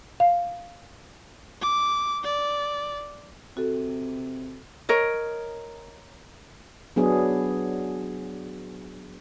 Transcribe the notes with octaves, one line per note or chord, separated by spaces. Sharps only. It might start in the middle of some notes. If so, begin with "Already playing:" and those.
F5
D6
D5
C3 F#4 A4
A#4 C#5 D#5
F#3 B3 D4 G#4